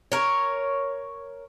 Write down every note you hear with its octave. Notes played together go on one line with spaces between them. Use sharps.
A#4 C#5